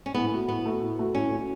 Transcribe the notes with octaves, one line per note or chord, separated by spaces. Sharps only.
C#4
A2 B3
A3 F#4
A2 B3
A3 F#4
A2
A3 F#4
A2 C#4
A3 F#4